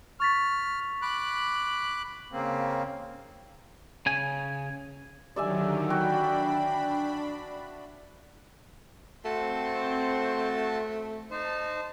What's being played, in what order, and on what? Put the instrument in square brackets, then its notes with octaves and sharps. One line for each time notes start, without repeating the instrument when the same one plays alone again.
[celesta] C#6 A6 B6 [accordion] F6
[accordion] B5 D6 F#6
C#3 A#3 C4
[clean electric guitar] C#3 G#5
[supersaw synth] D3 D#3 F#3 [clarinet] G4 [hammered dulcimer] D5 E5 G#5
[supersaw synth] D4 B5 [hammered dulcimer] F#4 [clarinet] G5
[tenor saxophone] A3 [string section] C4 C5 [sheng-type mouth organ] F#4 A5
[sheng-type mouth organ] D#4 C5 [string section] A5